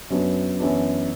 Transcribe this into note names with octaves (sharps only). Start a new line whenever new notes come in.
F#2 F#3 B3 D4
F#2 E3 B3 D4